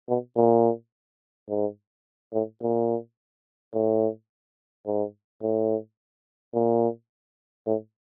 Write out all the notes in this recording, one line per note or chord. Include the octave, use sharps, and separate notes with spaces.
B2
A#2
G#2
A2
A#2
A2
G#2
A2
A#2
A2